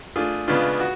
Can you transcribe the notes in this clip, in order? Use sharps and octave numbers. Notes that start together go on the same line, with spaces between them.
A3 D4 F4 G#4
C#3 G#3 B3 D4 F4
F#4